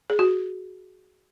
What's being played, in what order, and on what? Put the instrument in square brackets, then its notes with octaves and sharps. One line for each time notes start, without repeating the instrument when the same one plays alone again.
[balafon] G#4
F#4